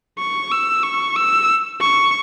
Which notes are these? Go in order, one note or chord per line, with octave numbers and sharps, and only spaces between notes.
C#6
E6
C#6
E6
C#6